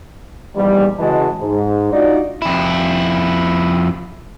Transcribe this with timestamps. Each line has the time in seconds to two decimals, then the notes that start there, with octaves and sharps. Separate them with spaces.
0.56 A#1 E2 G#2 G3
0.99 C#3 E3 G#3 F#4 D#5 A5
1.40 G#2
1.92 D4 D#4 F4 F#4 D5
2.42 F2 E4